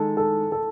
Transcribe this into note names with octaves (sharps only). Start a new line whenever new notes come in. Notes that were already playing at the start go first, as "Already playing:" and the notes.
Already playing: D#3 G#3 D#4 A4
A4
A4